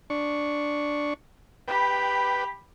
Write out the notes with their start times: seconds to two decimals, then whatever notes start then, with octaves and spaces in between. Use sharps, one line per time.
0.10 D4 C#6
1.68 G4 B4 G5 B5